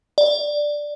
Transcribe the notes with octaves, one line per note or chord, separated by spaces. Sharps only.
D5